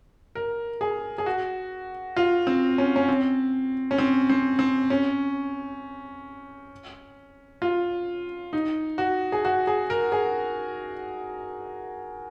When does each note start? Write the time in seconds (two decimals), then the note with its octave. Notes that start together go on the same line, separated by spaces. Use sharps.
0.35 A#4
0.81 G#4
1.18 G#4
1.26 F#4
2.17 F4
2.47 C4
2.78 C#4
2.96 C#4
3.09 C4
3.91 C#4
3.98 C4
4.30 C4
4.59 C4
4.90 C#4
7.62 F4
8.53 D#4
8.98 F#4
9.32 G#4
9.45 F#4
9.67 G#4
9.90 A#4
10.12 G#4